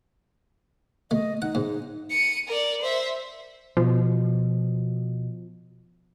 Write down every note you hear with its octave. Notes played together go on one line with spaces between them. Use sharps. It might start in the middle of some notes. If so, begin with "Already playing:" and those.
A3 D#5
D#4 F#5
G#2
C#7 D#7
A#4 D5
C5 E5
B2 F3